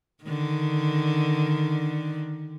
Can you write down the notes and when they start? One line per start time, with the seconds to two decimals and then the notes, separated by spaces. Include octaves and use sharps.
0.24 D3 D#3